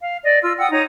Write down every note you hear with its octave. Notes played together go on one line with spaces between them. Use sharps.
F5
D5 D#5
F4 E6
F#5 G5 D#6 E6
D#4 C#5 A#5 D#6